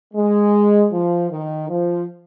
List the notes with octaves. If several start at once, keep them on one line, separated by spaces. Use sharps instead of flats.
G#3
F3
D#3
F3